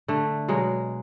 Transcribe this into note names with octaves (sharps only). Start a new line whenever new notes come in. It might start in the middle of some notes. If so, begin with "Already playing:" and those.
D3 A3
B2 F#3 G#3